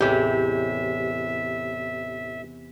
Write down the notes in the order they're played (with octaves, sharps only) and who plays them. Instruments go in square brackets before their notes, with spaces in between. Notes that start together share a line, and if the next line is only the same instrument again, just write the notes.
[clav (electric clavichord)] A1 E4 C#5 [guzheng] E2 C3 [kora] G4 [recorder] E5